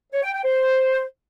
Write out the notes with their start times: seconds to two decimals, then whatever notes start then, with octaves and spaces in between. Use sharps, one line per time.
0.13 C#5
0.23 G5
0.34 G5
0.44 C5